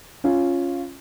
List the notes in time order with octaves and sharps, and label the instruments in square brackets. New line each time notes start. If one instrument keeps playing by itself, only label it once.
[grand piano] C#4 F4